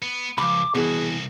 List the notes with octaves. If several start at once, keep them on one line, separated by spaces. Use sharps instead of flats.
B3
C#2 F3 B5 D6
C2 B2 E3 F#4 G#4